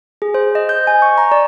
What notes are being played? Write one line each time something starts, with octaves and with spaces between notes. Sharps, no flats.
G#4
C5
D#5
G6
G#5
C#6
A#5
D5